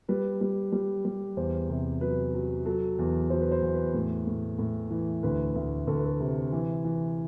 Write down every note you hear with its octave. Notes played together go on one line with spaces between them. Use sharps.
G3 B4
G3
G3
G3
E2 C5
C3
F#3 B4
F#3
F#3 A4
E2
F#3 C5
B4
C5
E2
B4
A2
A2
A2
E3
D2 B4
D2
D2 A4
B4
A4
C3
E3
E3